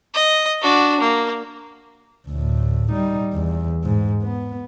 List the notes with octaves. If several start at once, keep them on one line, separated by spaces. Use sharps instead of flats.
D#5
D4 F#4
A#3
D2 A2
G3 D#4
E2
G#2
B3